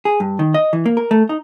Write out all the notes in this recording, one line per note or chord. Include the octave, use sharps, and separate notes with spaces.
G#4
G2
D#3
D#5
E3
A#3
A#4
A3
D#4